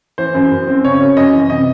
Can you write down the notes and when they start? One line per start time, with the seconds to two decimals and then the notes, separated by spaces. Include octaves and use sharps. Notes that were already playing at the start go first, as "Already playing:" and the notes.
0.18 E3 C5
0.35 F#2
0.52 F#2
0.67 C4
0.84 C#3 C#5
1.00 F#2
1.17 F#2 D#5
1.33 E3
1.49 C3 D#5